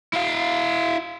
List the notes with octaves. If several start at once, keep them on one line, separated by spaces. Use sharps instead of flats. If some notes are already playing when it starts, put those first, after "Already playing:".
E4 F5